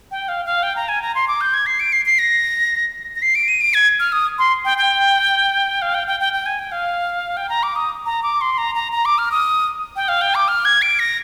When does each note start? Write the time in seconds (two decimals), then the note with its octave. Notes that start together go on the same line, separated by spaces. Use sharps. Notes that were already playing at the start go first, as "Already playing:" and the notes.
0.11 G5
0.28 F5
0.45 F5
0.63 G5
0.76 A#5
0.89 G#5
1.02 A#5
1.15 C6
1.28 D6
1.41 G6
1.54 G#6
1.66 C7
1.80 D7
1.93 C7
2.06 C7
2.19 A#6
3.16 A#6
3.22 C7
3.35 D7
3.48 D#7
3.61 D7
3.74 G#6
4.00 F6
4.12 D#6
4.39 C6
4.65 G5
4.78 G5
5.82 F5
5.94 G5
6.07 G5
6.20 G5
6.33 G5
6.46 G#5
6.59 G5
6.72 F5
7.37 G5
7.49 A#5
7.63 D6
7.76 D#6
8.06 A#5
8.23 D6
8.41 C6
8.58 A#5
8.75 A#5
8.92 A#5
9.05 D6
9.18 F6
9.31 D#6
9.96 G5
10.08 F5
10.21 G5
10.35 D6
10.48 F6
10.65 G#6
10.82 D7
10.99 A#6